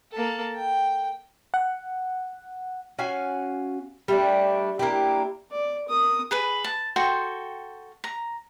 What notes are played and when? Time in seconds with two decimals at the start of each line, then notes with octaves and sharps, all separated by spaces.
0.12 A#3 A4
0.56 G5
1.54 F#5
2.99 C#4 F#4 F5 G#5
4.08 G3 A3 D4
4.79 A#3 D4 E4 G4
5.52 D5
5.89 A#4 D#6
6.31 G#4 B4 B5
6.64 A5
6.96 F#4 A4 G5 C6
8.04 A#5